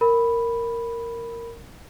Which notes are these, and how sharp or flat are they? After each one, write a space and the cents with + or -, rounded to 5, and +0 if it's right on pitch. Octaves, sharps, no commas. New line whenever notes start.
A#4 -10 B5 +0